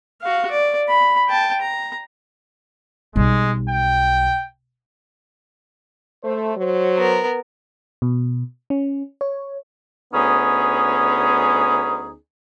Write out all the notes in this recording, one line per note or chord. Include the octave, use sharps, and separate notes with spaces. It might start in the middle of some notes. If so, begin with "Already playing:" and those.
F#4 F5
D5
B5
G5 A5
A#5
B1 G3 G#3
G5
A3 C5
F#3 C5
B3 A#4
B2
C#4
C#5
D2 B3 C#4 D#4 G#4